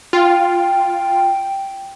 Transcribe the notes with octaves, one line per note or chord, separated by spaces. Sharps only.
F4 G5